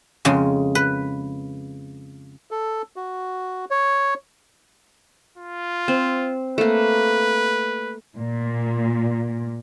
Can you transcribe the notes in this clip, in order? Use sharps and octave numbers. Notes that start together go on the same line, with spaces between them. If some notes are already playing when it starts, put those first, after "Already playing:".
F2 C#3 G#3
B4
A4
F#4
C#5
F4
C4
A3 A#3 B4
A#2